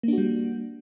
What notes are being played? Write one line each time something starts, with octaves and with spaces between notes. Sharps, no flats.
G3 A#3 D4 F#4